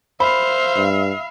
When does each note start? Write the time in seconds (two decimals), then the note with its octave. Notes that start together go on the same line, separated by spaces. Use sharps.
0.20 C5 E5 F5 B5
0.77 G2